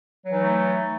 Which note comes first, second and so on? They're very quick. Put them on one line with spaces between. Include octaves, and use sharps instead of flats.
F#3 E3 D#4 A3